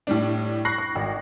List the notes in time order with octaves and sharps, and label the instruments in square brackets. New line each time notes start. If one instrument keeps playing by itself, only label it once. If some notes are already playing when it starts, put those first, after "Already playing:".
[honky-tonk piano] A2 G3 D4
B5 C#6 F#6 A#6 C7
C#6
G#1